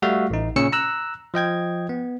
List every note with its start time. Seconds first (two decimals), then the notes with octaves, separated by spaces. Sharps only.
0.02 G3 A3 F#4 E5 F5
0.30 A1 D#4
0.56 A#2 C#3 C#4 E6 C#7
0.73 A#5 E6 F#6
1.34 F3 D#5 G5 G#6
1.89 B3